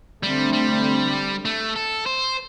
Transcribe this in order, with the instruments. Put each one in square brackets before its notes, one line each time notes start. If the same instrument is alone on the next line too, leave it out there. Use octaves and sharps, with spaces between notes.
[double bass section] D3 A3 C4 [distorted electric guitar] G3
[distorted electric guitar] G3
A3
A4
C5